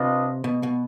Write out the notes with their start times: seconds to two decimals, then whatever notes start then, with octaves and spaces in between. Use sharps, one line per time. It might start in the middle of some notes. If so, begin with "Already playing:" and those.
Already playing: C3 D4 F4 B4 D#5
0.44 B2
0.63 B2